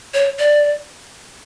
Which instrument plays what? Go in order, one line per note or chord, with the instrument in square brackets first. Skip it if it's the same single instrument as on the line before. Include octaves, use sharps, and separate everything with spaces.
[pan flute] C#5
D5